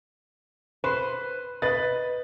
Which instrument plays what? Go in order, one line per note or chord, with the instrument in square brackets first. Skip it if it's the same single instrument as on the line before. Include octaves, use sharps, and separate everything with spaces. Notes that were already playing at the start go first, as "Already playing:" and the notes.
[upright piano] B4 [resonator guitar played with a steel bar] C5
[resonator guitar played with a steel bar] B4 D#5 [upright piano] A6